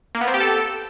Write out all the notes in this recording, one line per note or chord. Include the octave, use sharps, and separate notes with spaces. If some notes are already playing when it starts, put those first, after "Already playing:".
A#3
B3
C4
G4
A4